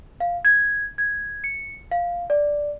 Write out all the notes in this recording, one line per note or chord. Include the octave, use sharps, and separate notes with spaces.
F5
G#6
G#6
C#7
F5
D5